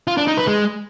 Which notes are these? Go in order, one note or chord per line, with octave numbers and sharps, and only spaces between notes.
F4
D4
D#4
B4
G#3